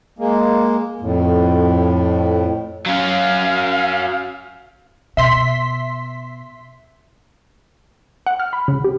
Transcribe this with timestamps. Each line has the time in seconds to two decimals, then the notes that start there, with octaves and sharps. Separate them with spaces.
0.19 G#3 A#3
1.01 F2 A2
2.86 F#3 C#4 F5
5.17 B2 E5 C6 B6
8.26 F#5
8.40 F6
8.53 B5
8.68 C#3
8.84 G4